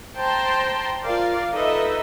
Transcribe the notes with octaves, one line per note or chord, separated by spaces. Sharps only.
C5 G5 A5 A#5 C6
F4 A#4 D5 F5
D#4 A4 B4 D#5 E5